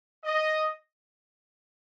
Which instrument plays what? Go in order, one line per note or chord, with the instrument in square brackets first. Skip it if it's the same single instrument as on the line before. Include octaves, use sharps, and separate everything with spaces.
[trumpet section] D#5